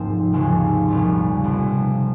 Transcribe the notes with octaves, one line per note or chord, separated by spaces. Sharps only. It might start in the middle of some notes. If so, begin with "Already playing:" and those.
Already playing: F1 G#2 F3 A#3 C4
D#2 C#3 F3 G#3 C#4
A#1 A#2 G3 C#4 F4
F1 F2 C3